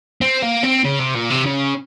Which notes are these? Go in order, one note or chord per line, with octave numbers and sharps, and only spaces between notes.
C4
A#3
C4
C#3
C3
A#2
C3
C#3